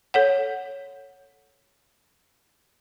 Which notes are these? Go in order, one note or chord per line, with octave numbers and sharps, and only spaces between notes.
A4 C#5 F#5